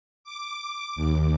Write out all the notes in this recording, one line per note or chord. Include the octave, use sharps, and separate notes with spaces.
D6
D#2